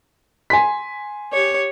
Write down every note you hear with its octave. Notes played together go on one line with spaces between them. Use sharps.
G#5 C6 B6
G4 C#5